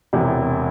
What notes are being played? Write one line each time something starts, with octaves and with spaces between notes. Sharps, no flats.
E1 E2 C3